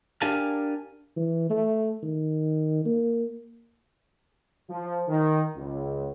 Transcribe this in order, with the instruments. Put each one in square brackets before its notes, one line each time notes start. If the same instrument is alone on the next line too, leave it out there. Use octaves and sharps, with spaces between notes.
[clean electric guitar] D4 G4 A#4 F5 G#5 A5
[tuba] E3
A3
D#3
A#3
[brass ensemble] F3
D#3
C#2